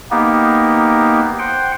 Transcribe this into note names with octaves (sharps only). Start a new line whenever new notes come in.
A#3 B3 D#4 G4
C5 F#5 G5